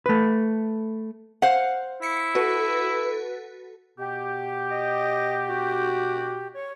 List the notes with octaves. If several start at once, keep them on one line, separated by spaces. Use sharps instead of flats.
A3 B4
C5 F5 F#5
E4 B6 C#7
F#4 A4 B4
B2 B3 G4
D#5
F#4
C#5